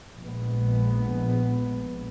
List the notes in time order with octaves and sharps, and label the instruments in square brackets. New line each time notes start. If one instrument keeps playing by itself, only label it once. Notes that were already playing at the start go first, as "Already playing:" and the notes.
[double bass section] A#1 G#3 B3